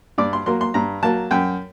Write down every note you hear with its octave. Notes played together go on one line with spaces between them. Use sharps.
G2 D5
C6
F#3 A#3 C6
C6
G2 A#5
F#3 A#3 A5
F#2 G5